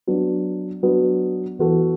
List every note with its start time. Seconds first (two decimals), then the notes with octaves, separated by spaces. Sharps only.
0.07 F#3 B3 D4 F#4
0.83 F#3 B3 D4 F#4
1.59 E3 B3 F#4 A4